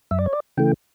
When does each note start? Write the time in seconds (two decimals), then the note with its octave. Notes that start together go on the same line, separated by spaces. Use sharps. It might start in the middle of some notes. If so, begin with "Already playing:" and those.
0.11 F#2 E5
0.19 D5
0.26 C#5
0.33 D5
0.57 C#3 E3 A3 G5